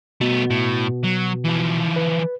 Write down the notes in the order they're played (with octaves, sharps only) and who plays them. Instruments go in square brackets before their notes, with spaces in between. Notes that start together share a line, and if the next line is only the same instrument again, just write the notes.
[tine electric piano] B2 [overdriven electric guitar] A3 B3
[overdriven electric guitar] A2
F#3
E3 F3
[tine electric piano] B4